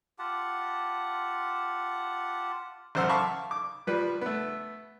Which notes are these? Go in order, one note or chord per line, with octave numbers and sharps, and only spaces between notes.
F4 G4 F#5 A5
A1 F#2 C5 F#5 E6 F6
F5 A5 B5 C#6 D6
D6
F3 G3 B4
A3 B3